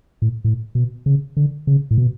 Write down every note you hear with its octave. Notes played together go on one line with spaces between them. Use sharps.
A2
A2
B2
C#3
D3
C#3
A2
B2